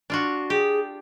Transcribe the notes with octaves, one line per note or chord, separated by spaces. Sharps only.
D4 F4 F#4
G4 G#4